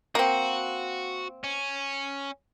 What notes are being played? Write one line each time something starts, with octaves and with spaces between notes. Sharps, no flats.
A#3 C4 F#4
C#4